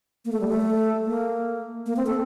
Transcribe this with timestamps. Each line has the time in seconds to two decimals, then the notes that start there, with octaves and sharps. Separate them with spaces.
0.25 A#3
0.32 A3
0.40 G3
0.48 A3
1.05 A#3
1.86 A#3
1.96 C4
2.06 A4